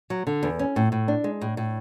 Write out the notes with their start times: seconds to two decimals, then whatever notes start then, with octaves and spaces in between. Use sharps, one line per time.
0.10 F#3
0.27 D3
0.43 E2
0.59 C#4
0.76 A2
0.92 A2
1.08 D4
1.24 G#3
1.41 A2
1.57 A2